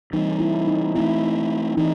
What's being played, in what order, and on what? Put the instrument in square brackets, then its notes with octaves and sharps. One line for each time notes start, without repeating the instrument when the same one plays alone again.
[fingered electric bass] E3 G3 C4 [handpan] D#4
[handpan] E4
D#4
[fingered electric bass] E3 A3 C4 [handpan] E4
[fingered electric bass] E3 A3 C4 [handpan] D#4